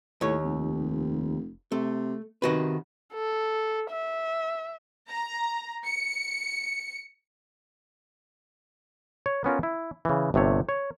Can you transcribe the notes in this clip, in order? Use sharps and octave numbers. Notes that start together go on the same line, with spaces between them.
D#2 A2 C#5
F1
C3 A3
C3 D#3 F#4 B4
A4
E5
A#5
C#7
C#5
B3 C#4 F4 A#4
E4
C#3 E3
G1 C3 A3 C#5
C#5